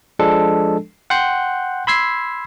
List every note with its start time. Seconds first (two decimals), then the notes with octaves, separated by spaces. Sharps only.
0.19 F3 G#3 D4 A4
1.10 F#5 G5 C6 F#6 G6
1.87 B5 C6 E6 G#6 B6 C7